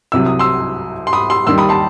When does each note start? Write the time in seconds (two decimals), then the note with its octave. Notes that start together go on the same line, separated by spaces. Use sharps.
0.12 C2 C3 F#3 E6
0.26 D#6
0.39 C6 E6
1.07 C6
1.13 B5 D#6
1.30 C6 E6
1.47 D#2 D#3 G3 C6 E6
1.58 B5 D#6
1.69 A5 C6